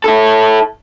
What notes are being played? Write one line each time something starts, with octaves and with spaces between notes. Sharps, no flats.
E4 A4